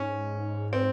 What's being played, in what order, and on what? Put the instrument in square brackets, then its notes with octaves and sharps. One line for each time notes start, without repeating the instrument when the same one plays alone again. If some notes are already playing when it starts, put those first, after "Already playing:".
Already playing: [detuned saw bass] G#2 [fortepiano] C#4
[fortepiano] C4